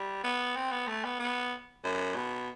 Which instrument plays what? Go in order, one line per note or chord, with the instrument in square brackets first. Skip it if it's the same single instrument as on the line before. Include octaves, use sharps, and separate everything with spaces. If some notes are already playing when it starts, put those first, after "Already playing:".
Already playing: [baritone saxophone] G3
B3
C4
B3
A3
B3
B3
F#2
B2